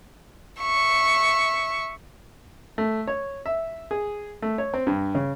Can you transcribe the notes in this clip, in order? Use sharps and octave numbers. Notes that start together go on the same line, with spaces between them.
E5 C#6
A3
C#5
E5
G#4
A3
C#5
C4
G2
C#3